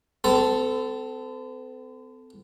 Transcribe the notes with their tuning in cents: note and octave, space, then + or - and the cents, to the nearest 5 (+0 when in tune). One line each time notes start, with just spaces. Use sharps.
C4 -45 A4 +0